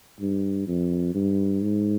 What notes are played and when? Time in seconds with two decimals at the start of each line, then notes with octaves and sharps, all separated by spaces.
0.20 G2
0.67 F2
1.14 G2
1.62 G#2